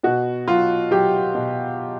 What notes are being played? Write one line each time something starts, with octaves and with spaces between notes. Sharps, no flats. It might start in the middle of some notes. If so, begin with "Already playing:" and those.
B2 F#4
F#3 F4
F#3 G4
B2